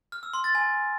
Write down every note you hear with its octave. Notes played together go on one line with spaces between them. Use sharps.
F6
E6
C6
A6
G#5